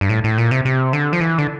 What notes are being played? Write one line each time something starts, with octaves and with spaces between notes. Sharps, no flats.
G2
A2
A2
A#2
C3
C3
D3
F3
E3
D3